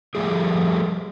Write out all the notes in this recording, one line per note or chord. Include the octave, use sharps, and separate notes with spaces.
F3 G3 A3 G#4